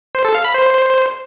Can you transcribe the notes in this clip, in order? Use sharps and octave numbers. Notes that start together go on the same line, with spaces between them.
C5
A4
F5
B5
C5